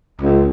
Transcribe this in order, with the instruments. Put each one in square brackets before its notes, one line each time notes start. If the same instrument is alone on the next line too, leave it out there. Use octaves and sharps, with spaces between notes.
[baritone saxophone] C#2